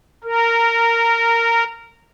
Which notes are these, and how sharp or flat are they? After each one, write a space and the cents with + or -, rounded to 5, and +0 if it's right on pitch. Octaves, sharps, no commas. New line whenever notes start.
A#4 -15